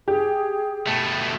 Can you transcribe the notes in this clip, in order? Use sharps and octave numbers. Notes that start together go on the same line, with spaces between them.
G4 G#4
B2 A3